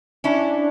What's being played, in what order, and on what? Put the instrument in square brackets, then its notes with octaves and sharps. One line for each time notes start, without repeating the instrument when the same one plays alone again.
[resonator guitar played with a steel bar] C#4 E4 [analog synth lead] D4